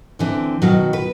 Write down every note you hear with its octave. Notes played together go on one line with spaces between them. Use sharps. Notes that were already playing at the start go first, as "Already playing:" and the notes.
D3 E3 C4
B2 D#3 F#3
B4